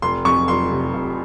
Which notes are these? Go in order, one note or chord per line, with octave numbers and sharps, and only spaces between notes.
F1 C6
F2 C#6
F1 C6
C3
F1